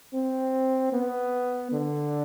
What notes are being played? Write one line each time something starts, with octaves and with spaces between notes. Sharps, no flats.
C4
B3
D3